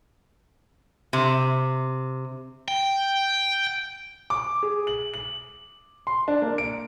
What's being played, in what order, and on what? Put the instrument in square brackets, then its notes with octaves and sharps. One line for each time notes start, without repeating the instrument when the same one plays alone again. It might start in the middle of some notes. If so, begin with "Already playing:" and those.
[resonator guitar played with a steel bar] C3
[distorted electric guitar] G5
[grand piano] D6
G#4
F#7
F#7
C6
D4
A#3
D7